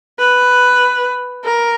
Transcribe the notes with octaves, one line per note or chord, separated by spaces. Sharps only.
B4
A#4